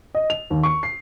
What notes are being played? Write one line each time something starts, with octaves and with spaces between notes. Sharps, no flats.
D#5
F7
D#2
C#6
C7